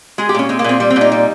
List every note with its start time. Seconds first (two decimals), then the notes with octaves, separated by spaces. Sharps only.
0.18 G#3 G#4
0.29 G4
0.34 A#2 C#4
0.49 G#3 C4
0.59 A#3
0.64 A#2 C4
0.80 G3
0.90 C4
0.96 A#2
1.01 D#4
1.12 G3